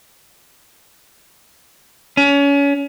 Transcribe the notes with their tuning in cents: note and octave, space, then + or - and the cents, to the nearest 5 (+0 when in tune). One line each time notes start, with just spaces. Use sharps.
C#4 +30